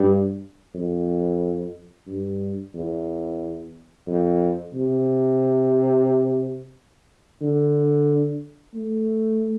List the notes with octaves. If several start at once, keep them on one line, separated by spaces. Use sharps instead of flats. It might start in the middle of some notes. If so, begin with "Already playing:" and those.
Already playing: G2
F2
G2
E2
F2
C3
D3
A3